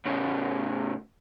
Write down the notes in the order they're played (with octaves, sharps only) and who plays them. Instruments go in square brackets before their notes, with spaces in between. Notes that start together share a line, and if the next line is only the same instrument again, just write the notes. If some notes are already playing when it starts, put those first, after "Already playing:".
[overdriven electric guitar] A2 C#3